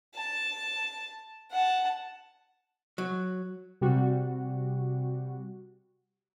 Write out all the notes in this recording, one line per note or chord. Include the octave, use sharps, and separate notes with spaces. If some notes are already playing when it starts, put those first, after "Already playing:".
A5
F#5 A5
F#3
C3 G3 F#4